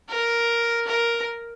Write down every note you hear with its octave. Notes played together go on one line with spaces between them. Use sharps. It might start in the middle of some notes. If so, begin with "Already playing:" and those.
A#4
A#4